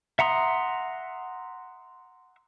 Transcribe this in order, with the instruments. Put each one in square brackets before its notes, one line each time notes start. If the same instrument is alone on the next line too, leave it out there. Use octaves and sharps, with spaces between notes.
[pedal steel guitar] E5 F#5 A#5 C6 D#6